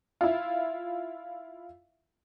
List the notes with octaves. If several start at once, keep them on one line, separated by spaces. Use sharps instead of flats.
E4 F4